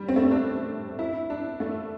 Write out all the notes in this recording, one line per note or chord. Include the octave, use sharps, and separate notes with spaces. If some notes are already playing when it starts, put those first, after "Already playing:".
Already playing: G3
C4
A3
C4
D4
E4
D4
A3